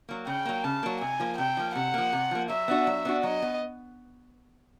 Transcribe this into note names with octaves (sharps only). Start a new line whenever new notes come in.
F#3 A#3
C#3 G5
F#3 A#3
C#3 A5
F#3 A#3
C3 G#5
F3 A#3
C3 G5
F3 A#3
C3 F#5
F3 A#3
C3
F3 A#3
F#3 E5
B3 D4 F#4
F#3
B3 D4 F#4
F#3 D#5
B3